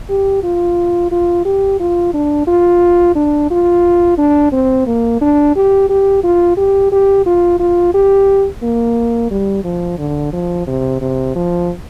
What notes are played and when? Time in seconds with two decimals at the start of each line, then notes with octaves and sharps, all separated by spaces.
0.09 G4
0.43 F4
1.11 F4
1.45 G4
1.80 F4
2.14 D4
2.47 F4
3.15 D4
3.50 F4
4.18 D4
4.52 C4
4.87 A#3
5.21 D4
5.56 G4
5.89 G4
6.23 F4
6.57 G4
6.92 G4
7.26 F4
7.59 F4
7.94 G4
8.63 A#3
9.31 G3
9.64 F3
9.99 D3
10.33 F3
10.67 C3
11.01 C3
11.35 F3